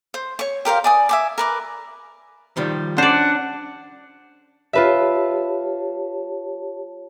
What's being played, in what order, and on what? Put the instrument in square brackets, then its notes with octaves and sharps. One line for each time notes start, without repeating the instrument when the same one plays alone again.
[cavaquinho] C5
C#5 C#6
G4 A#4 C5 F5
D5 G#5 D#6
E5 G#5 D6
A#4 B4 D6
[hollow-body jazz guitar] D#3 F3 G3
[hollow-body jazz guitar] C#4 [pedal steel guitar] D4 [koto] C5 D5 [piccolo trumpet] F#5
[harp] F4 B4 E5 [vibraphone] G4 C#5 A5